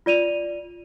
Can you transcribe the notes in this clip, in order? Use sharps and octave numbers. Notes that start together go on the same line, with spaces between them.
F4 D5 D#7 F7